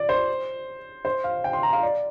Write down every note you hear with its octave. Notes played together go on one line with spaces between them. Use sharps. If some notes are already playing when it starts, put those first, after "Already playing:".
Already playing: D5
C5
C5
F5
G5
C6
A#5
F5
D5